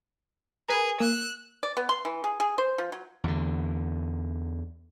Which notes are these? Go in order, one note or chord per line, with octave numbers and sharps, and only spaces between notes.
G#4 A#4 B4 G#5
A#3 E6 F#6
D5
B3
C6
E3
G#4
G#4
C5
F3
F#3
E2 D3